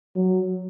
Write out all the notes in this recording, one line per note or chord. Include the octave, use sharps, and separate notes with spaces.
F#3